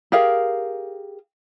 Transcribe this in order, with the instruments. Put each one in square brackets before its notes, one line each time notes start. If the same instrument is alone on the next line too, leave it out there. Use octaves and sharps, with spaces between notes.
[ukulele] G4 G#4 A#4 F5